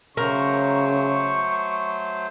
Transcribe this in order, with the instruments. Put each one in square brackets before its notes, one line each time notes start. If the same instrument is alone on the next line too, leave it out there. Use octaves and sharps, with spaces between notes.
[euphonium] C#3 [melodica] F#3 A3 C5 [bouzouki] A#4 [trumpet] C#6